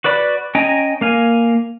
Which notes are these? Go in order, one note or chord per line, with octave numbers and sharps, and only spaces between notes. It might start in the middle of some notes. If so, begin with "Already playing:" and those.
F#4 B4 D5 B5
C#4 D#5 G5 G#5 A#5
A#3 F5 G#5